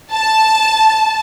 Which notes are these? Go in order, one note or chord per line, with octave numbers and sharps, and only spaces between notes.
A5